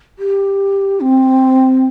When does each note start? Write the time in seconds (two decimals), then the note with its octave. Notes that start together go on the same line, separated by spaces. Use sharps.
0.19 G4
1.01 C4